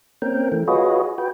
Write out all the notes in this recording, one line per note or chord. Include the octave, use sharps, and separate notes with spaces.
A#3 C4 C#4 A#4 G5
E3 A3
F4 F#4 G#4 B4 C#5 D#5
F#4 B4 G5